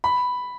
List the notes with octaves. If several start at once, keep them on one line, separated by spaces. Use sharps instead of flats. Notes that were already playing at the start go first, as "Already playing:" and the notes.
B5